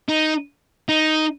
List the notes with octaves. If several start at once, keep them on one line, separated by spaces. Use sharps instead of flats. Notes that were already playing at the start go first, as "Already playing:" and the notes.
D#4
D#4